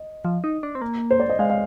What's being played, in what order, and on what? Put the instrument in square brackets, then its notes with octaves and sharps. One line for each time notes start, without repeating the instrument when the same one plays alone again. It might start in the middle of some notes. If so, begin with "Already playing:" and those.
Already playing: [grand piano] D#5
[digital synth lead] F3
D#4
D4
C4
A#3
[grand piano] C5
D5
D#5
[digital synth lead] G#3 [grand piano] F5
[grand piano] F5